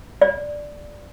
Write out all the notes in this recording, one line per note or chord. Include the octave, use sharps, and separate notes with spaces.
D5